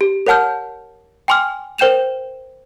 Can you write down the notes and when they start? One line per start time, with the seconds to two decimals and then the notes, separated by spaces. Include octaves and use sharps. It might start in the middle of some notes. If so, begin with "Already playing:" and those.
0.01 G4
0.27 A#4 C#5 F#5 A5 F6 G6
1.28 G5 G#5 C6 D6 F6
1.78 A#4 C5 G5 G6 E7 F7